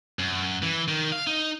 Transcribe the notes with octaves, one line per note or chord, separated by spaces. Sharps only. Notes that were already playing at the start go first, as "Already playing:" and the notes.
F#2
E3
D#3
F5
D#4